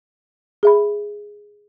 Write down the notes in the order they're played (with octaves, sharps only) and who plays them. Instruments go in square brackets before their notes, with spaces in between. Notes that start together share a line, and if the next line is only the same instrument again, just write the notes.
[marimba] G#4 E5 B5